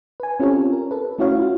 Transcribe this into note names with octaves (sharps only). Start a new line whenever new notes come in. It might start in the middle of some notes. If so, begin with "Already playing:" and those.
B4 G#5
C4 C#4 F4 G4 A4 C#5
A#4
A4 B4
A3 C#4 E4 F#4 C#5 F5
F4 F#4